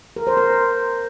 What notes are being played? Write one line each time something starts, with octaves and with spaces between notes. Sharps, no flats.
A#4
C5
A#4